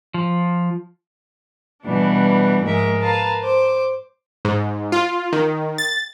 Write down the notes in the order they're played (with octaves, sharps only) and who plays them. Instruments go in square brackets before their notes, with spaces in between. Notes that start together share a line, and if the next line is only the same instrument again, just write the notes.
[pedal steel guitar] F3
[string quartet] B2 E3 G3 D4
G#2 F3 G#3 A#4 E5
A#4 B4 F5 A5 A#5
C5 D6
[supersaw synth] G#2
F4
D#3
A6